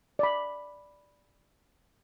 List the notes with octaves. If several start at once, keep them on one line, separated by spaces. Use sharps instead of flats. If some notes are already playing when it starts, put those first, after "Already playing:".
D5 B5